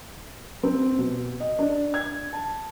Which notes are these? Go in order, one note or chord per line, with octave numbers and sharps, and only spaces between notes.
C4
B2
D#5
D4
G#6
A5